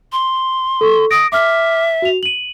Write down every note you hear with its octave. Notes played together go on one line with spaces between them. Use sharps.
C6
A4 C#6
D#6 A#6 D7
E5 D6 F6
F#4 F7
D#7 F#7